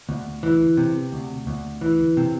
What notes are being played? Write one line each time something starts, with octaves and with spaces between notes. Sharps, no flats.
D2
E3
C3
D2
D2
E3
C3